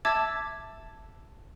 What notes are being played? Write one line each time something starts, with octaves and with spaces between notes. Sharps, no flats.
E5 A5 D6 E6 G#6 A6